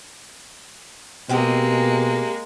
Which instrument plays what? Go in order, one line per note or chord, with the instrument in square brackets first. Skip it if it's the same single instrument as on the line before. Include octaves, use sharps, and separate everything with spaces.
[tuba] B2 [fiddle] G#3 A#3 [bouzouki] C4 G4 G#4